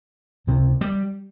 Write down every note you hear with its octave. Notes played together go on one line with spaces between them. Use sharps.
C#2 C3
G3